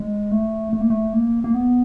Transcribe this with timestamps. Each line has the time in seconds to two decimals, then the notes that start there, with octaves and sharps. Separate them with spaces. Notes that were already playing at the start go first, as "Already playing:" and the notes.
Already playing: G#3
0.32 A3
0.73 A3
0.81 A#3
0.90 A3
1.13 A#3
1.44 A#3
1.54 B3